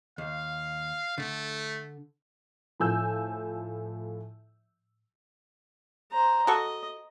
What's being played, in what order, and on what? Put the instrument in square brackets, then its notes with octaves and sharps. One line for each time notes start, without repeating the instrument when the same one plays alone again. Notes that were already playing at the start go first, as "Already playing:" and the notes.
[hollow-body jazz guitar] D#2 [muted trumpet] F5
[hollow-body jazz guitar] D3 [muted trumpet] A3
[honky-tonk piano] A2 F3 G#5 E6 G6
[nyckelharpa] C5 A#5
[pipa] F#4 A4 C#6 [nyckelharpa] D#5